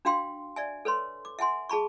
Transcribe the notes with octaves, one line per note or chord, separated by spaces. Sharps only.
D4 F#4 F5 G5 C6
D5 E5 G#5
A4 B4 C#5 C6
D6
E5 F#5 G#5 C6
G#4 A5 B5 C#6